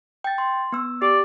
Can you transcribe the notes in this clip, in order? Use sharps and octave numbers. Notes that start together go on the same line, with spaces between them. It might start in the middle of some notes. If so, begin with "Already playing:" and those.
G5 A6
C6
B3 E6
G4 D5